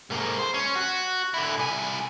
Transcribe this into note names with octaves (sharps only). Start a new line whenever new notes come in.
G#2 A#3
C5
C#4
F#4
D3 E4
C2 G#5